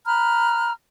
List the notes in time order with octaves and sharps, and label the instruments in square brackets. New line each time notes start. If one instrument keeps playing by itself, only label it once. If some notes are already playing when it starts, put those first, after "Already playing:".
[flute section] A#5 B5 F6 F#6